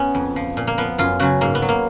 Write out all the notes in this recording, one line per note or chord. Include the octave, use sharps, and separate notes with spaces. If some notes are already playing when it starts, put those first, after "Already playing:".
Already playing: B3 C#4
F2
F3
A#2
A#3
F3 B3
F#2 F4
C#3 F#3 F#4
G#2 A#3
B3
F#3
A#3